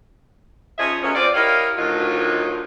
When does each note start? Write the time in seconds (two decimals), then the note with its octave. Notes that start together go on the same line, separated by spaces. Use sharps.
0.78 F3 C#4 D#4 G#4 D#5 E5
1.03 F#3 G#3 A3 B3 C#4
1.15 C4 F4 C5 D5
1.34 E4 G4 A#4 C#5 D#5 F5
1.77 D2 A2 D#3 F#3 D#4 F4